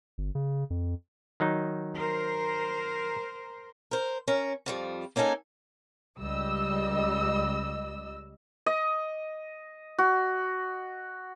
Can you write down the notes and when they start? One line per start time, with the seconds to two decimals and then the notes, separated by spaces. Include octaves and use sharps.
0.18 G1
0.35 C#3
0.70 F2
1.40 D#3 F#3 D#4
1.95 A#4 C5
3.91 A#4 C5
4.28 C#4 A#4
4.66 F2 F3 G3
5.16 A#3 C#4 D#4 A4 G#5
6.18 C#2 G3 D#5 E6
8.66 D#5
9.98 F#4